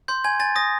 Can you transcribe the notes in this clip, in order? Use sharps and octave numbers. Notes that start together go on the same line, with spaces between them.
C6 G6
G#5 G#6
G#5 A6
D#6 A#6